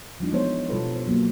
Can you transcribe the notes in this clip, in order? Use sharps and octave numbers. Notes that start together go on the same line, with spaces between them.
F3 G3 D4 D#4
E3 G#3 B3 D4 C5 C#5
B2 G3 F4 A4 B4
C5
F#3 A#3